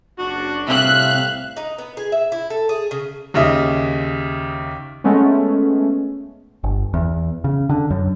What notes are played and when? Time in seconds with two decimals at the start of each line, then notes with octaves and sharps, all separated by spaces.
0.19 F#1 D4 F#4
0.69 C2 A2 C3 E5 F5 F#6
1.57 D#4
1.78 B3
1.97 G#4
2.12 E5
2.32 E4
2.50 A4
2.69 G#4
2.91 C#3
3.34 D#2 C#3 D#5 E5
5.04 G#3 A3 B3 C#4
6.64 G1
6.94 E2
7.44 C#3
7.69 D3
7.91 F#2